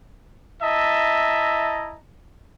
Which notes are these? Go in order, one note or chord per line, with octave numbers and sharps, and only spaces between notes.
E4 D#5 E5 A5 A#5